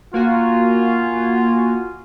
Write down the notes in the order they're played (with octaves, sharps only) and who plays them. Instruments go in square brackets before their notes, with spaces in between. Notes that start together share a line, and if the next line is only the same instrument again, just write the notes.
[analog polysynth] A#3 F#4 G#5 [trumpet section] F4